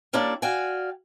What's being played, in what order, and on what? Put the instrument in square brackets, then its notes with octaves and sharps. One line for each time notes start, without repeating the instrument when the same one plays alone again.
[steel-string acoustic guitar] G3 A#3 C#4 D4 E4 D5
F#4 D5 F5 G5 G#5